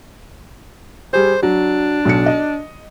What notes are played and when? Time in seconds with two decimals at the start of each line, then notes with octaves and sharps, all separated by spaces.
1.13 G3 G#4 C5
1.43 F#3 D4
2.05 B1 C#7
2.26 D#5